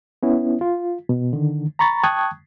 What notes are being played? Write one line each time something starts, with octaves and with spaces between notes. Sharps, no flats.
B3 C#4 E4
F4
B2
D3 D#3
A#5 B5 C#6 A6
G5 A5 C#6 D#6 F#6 G#6